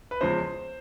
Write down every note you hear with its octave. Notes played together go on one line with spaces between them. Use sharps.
B4
E2 C#3 F3 G#3 C5